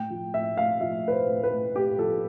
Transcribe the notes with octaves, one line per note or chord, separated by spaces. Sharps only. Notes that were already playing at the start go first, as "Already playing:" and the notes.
Already playing: A2 G5
F3
A2 E5
A2 F5
F3 E5
A2 B4
C5
A2
B4
A2
A2 G4
F3 A4